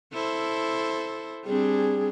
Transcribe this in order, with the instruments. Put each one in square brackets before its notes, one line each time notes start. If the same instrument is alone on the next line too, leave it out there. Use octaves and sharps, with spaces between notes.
[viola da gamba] E4 A4 C5
[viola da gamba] G3 C4 D4 [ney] G#4